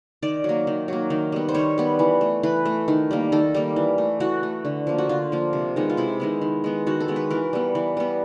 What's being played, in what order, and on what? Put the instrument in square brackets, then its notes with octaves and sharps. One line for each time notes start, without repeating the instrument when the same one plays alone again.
[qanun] D#3 D5
F#3 A#3
D#3
F#3 A#3
D#3
G3 B3
C5
D#3 C#5
G3 B3
E3
A3
E3 B4
A3
D#3
G3 A#3
D#3 A4
G3 A#3
E3
A3
E3 F#4
A3
D3
F3 A#3
F#4
D3 F4
F3 A#3
C3
D#3 G#3 B3
F4
C3 E4
D#3 G#3 B3
D#3
G#3 B3
D#3 F#4
A4
G#3 B3
B4
E3 A#4
G3 B3
E3
G3 B3